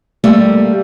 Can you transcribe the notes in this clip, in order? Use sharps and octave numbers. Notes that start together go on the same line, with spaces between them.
G3 A3 A#3